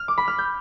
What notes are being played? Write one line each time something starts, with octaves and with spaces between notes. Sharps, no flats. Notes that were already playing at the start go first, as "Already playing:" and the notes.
Already playing: F6
D6
B5
F6
G6